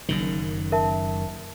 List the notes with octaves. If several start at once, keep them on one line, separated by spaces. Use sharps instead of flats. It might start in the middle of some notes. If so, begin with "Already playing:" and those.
F#1 F#2 D#3
A#4 E5 A5